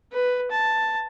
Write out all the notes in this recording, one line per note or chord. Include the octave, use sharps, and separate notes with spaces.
B4
A5